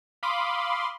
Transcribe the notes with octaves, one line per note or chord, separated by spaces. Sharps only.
F5 B5 C6 D6 D#6